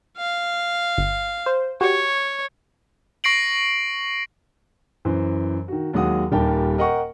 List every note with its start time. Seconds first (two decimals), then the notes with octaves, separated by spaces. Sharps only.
0.17 F5
0.98 G1
1.46 C5
1.81 F#4 G4 C#5
3.24 C#6 A#6 C7 D7 F#7
5.05 F#2 E3 C5
5.68 D#3 F#4
5.94 D#2 F#3 G#3 F#5 D#6
6.32 D#1 D#3 G3 A#4 G5 A5
6.78 A#4 D#5 F#5 G5 C#6